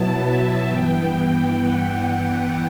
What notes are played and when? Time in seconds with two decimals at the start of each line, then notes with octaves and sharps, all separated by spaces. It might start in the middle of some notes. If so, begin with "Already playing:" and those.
Already playing: B2 F#3 B3 E4 A5
0.22 E5
0.66 G2 E3 B3 G5
1.54 F#5